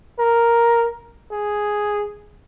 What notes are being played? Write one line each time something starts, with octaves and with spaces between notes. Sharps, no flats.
A#4
G#4